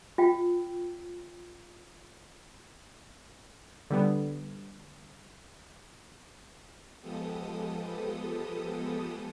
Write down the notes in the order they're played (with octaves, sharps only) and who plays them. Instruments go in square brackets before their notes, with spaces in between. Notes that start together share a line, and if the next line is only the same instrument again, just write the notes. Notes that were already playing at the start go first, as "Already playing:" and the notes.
[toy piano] F4 G5
[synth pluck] D3 G3 B3
[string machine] F3 G#3 B3 G4 A4 D#6